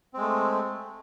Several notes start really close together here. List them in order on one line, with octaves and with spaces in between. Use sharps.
C4 G#3 A3